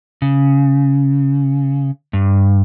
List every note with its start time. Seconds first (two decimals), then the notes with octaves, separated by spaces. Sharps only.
0.22 C#3
2.13 G2